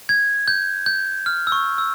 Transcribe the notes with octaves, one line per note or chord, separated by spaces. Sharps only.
G#6
G6
G6
F6
E6
C#6
E6